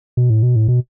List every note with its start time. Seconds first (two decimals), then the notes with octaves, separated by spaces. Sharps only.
0.17 B2
0.30 A2
0.43 B2
0.56 A2
0.68 B2